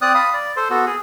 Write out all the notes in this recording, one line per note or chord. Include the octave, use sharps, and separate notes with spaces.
C4 D5 D#6 F#6
F5 B5 D#6
D5
A4 C5 C6
B3 F#4 A4
G#4